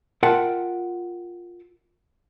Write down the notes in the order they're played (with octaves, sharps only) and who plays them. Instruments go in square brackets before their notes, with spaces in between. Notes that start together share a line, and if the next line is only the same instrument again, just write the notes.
[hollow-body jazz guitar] F4 A#4 E5 F#5 G5 A5